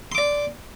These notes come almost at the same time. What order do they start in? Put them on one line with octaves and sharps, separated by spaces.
C6 D6 D5